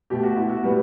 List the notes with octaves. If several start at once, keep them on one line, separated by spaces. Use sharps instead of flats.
B2 A3 G4
F#4
E4
F#4
A2 G3 B3